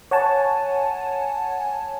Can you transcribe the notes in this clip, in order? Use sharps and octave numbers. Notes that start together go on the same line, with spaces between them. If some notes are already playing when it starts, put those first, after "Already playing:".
C#5 F#5 G#5 A5